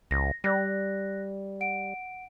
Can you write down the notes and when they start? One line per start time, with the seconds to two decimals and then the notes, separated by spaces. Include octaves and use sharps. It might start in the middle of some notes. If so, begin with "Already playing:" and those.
0.11 C#2 A#6
0.44 G3 D5 F#6 A#6
1.61 F#5 D7